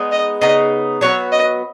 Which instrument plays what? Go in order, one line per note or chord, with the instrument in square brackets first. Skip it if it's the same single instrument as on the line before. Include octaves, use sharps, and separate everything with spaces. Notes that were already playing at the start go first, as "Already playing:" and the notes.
Already playing: [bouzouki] G#3 B3 D#4
[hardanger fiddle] D#5
[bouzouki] C#3 B3 D#4 [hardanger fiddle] D#5
[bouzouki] F#3 B3 F#4 B4 [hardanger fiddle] C#5
[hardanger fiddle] D#5